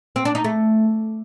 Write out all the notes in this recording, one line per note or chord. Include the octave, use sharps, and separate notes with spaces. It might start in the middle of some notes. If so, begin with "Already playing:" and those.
C4
D4
D#4
A3